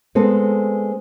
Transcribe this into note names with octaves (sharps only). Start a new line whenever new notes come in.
G#3 B3 C4 A4